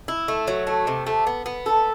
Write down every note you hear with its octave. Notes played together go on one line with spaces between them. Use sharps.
E4
A3
F#3
A3
C3
A3
B3
B3
A4